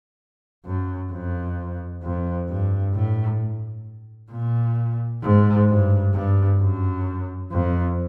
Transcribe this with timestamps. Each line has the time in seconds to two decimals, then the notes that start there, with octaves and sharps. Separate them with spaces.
0.66 F#2
1.12 F2
2.03 F2
2.49 G2
2.94 A2
4.31 A#2
5.22 G#2
5.68 G2
6.14 G2
6.60 F#2
7.51 F2